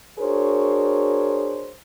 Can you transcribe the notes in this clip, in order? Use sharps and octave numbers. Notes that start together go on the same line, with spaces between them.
D4 F#4 G#4 A#4 C5 C#5